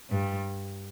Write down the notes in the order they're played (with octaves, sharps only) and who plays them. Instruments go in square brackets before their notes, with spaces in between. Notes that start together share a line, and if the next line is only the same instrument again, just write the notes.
[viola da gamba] G2